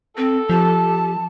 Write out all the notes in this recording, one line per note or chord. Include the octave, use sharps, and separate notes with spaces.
C4 A4
F3 G4 A5